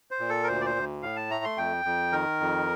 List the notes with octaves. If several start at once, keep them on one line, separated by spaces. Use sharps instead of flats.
C5
A#2
A4
A#4
D2 C5
D5
C5
D2
A2 F5
A5
A3 A#5
C6
F2 G5
F2
D#3 A#4
F2